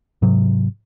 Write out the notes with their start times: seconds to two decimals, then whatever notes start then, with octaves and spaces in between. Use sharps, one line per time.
0.22 G#2 C3 F#3